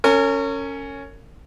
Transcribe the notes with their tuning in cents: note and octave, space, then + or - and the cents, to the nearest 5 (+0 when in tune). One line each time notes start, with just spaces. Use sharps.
C#4 +0 A#4 -40